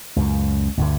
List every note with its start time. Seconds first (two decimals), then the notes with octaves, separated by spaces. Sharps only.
0.16 C#2 F#2
0.78 D2 G2 D3